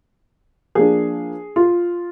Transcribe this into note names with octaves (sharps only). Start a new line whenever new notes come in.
F3 A#3 D4 G#4
F4